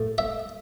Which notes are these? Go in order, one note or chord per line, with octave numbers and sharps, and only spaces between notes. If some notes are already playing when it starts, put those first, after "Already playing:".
Already playing: A2
E5